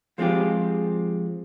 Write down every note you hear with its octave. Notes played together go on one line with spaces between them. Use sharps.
F3 G#3 C4 F4 G4